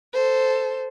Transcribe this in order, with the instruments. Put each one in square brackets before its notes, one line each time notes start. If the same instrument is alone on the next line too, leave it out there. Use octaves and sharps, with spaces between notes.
[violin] A4 C5